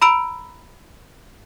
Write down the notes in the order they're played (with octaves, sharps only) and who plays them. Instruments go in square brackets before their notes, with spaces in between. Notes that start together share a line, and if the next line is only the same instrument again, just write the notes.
[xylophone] A#5 B5 E6 D7 F7